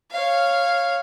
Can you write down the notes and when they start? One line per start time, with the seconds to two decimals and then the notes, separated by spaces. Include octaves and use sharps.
0.11 C#5 F5